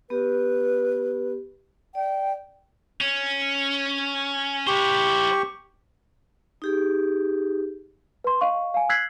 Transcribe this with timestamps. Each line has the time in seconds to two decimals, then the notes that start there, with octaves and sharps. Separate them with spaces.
0.10 B3 G4 B4
1.95 D5 G5
3.01 C#4
4.67 E4 G4 C5 C#6
6.62 D#4 G4 G#4
8.24 B4 C6
8.41 D#5 F5 C#6
8.74 F5 G#5
8.89 E6 F#6 G#6 B6 C7 F#7